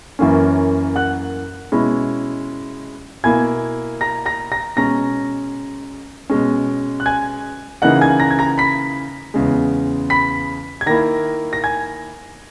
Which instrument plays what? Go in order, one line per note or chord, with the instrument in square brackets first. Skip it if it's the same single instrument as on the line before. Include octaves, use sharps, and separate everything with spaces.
[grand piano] F#2 E3 A#3 C#4
F#5 F#6
B2 G#3 C#4 E4
B2 A#3 E4 G#5 G#6
A#5 A#6
A#5 A#6
A#5 A#6
B2 G#3 C#4 A#5 A#6
B2 G#3 C#4
F#6
G#5 G#6
C#3 E3 A#3 D#4 F#5 F#6
G#5 G#6
A#5 A#6
G#6
A#5 A#6
B5 B6
E2 C#3 G#3
B5 B6
G#6
D#3 A#3 E4 A#5 A#6
A#6
G#5 G#6